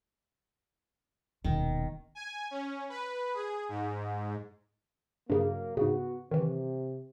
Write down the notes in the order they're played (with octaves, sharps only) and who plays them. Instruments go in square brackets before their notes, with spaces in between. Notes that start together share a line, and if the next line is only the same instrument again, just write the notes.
[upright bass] D#1 B2 [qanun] D#3
[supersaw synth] G#5
C#4
B4
G#4
G#2
[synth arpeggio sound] G2 C#3 [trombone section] F#3 A#3
[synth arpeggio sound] G#2 C#3 [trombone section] B3 F#4
[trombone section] C3 [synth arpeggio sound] D#3 E3